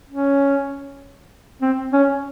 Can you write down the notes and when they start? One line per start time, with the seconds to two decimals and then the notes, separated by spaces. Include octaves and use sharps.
0.10 C#4
1.62 C4
1.93 C#4